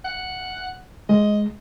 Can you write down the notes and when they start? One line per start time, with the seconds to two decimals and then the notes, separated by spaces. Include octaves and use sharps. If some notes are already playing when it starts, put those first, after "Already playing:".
0.04 F#5
1.09 G#3 D#5